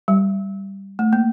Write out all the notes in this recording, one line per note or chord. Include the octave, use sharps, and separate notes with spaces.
G3
A3
A#3